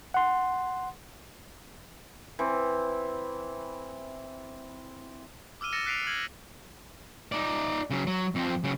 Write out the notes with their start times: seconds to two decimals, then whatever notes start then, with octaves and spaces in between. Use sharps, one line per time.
0.14 F#5 C6
2.39 E3 C4
5.61 D6 E6 F6 D#7 G7
5.72 E6 A6 A#6 C#7 E7
5.86 F#6 B6 C7 D7 D#7 F7
6.07 F6 G#6 F#7
7.32 D#4 D5
7.90 C#3 F#3
8.07 F#3
8.35 F2 C4
8.64 C#3 F#3